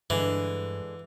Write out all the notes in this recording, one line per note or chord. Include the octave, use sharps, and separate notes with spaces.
G2 D3 E3 G#3